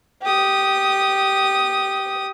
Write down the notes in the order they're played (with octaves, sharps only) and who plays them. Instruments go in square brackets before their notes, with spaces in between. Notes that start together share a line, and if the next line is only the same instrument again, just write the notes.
[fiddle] G4 D#6